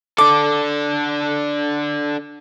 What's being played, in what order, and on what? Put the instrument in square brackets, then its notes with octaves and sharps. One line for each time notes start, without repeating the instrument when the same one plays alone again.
[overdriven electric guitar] D4 A4 [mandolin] D6